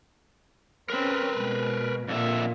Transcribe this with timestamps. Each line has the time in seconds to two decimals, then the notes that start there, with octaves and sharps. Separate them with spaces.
0.90 C4 C#4 A#4 B4
1.34 B2 G#3
2.08 F2 A#2 D3 E5